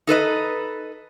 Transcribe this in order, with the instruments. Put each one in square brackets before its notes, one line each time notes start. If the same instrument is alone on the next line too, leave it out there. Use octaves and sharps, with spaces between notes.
[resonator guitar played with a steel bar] D#4 A4 B4 D#5